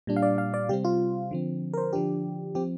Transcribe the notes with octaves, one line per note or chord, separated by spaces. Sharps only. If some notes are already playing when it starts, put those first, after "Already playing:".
A#2 G3 D4
F5
D5
F5
D5
C3 G3 C4 G4
F4
D3 F3 C4
A#4
C5
D3 F3 D4 G4
F3 C4 G4